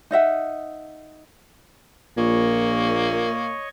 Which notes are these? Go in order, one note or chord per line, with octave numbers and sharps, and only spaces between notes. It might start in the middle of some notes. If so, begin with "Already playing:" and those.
D#4 D#5 E5 F#5
A#1 A#2 A#3 C#5 D#5 C#6